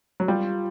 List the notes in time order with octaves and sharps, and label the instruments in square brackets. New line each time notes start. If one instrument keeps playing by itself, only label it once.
[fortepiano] F#3
[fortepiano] G3 [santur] F4